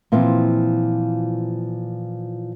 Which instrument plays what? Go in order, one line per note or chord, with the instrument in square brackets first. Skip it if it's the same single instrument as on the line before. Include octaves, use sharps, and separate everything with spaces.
[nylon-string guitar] A#2 E3 F3 C4